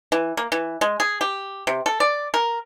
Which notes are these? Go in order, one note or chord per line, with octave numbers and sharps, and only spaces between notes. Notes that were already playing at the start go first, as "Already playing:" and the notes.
E3
A#3
E3
G#3
G#4
G4
C3
A4
D5
A#4